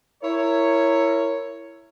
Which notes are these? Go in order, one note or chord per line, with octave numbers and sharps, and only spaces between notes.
E4 A#4 C#5